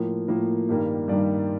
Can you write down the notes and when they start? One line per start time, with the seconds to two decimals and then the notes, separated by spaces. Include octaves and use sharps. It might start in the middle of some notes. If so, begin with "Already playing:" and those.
Already playing: A2 F3 A#3
0.28 A2 F3 A#3 A#4
0.69 G2 D#3 G3 A#3
1.08 G2 D#3 G3 A#3 D5